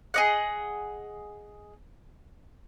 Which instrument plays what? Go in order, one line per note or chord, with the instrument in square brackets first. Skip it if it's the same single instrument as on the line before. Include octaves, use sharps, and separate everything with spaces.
[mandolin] G#4 D#5 F#5